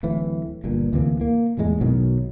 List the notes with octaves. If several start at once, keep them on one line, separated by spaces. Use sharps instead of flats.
D1 A2 E3
G1 G2 A#2
D2 C3 E3 A#3
A#3
D#1 E2 A2 G#3
B1 B2 D#3 F#3